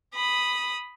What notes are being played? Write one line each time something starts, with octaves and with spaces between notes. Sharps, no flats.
B5 D#6